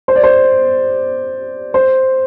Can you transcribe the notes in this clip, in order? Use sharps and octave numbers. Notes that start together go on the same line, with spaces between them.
C5
D5
C5
C5